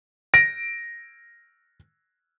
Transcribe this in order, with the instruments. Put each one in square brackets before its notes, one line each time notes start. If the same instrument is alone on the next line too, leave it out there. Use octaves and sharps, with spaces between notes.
[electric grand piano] A#6 D7